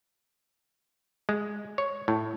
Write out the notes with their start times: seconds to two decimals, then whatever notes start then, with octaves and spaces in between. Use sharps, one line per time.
1.29 G#3
1.78 C#5
2.08 A2